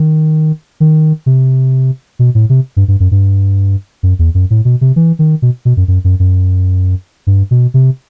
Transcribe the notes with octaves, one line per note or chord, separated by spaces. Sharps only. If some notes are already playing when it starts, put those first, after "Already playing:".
Already playing: D#3
D#3
C3
B2
A2
C3
G2
G2
F#2
G2
F#2
E2
F#2
A2
B2
C3
E3
D#3
B2
B2
F#2
F#2
F#2
F#2
G2
B2
C3